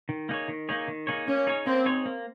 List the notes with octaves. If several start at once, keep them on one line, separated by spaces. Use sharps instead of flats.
D#3
A#3 D#4 G#4 C#5
D#3
A#3 D#4 G#4 C#5
D#3
A#3 D#4 G#4 C#5
A#3 C#4
D#4 G#4 C#5
A#3 C4
D#4 G#4 C#5
A#3